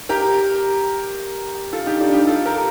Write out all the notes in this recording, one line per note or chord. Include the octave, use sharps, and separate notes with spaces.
G4 A#4
F4 A4
D#4 G4
D4 F4
D#4 G4
F4 A4
G4 A#4